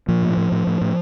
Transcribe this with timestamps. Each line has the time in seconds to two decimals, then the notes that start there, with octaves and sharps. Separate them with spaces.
0.08 A#2 F3
0.22 A2
0.37 A2
0.52 A2
0.67 A2
0.81 A2